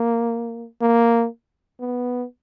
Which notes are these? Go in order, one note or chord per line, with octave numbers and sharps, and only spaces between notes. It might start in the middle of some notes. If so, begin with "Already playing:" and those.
Already playing: A#3
A#3
B3